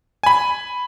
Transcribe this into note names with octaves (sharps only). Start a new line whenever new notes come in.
G#5 B5